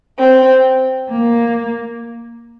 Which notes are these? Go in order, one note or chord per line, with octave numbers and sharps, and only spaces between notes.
C4
A#3